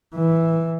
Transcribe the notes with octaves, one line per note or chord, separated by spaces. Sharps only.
E3